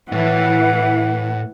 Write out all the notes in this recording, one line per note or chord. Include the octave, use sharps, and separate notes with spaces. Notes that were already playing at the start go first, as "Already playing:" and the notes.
A2 E3 F#5